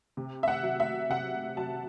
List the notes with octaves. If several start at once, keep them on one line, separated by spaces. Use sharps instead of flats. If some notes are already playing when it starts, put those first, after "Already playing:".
C3
E5
F#5
F#3
E5
C3 F#5
F#3 A5